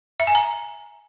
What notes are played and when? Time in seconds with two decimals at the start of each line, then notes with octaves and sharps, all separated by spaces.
0.20 E5
0.27 G#5
0.35 A#5